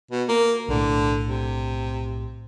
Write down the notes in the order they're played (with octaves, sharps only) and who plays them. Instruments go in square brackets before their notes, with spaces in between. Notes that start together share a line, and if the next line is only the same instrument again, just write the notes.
[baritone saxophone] B2
A#3
[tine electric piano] B1 A2 [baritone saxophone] D3
[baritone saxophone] C3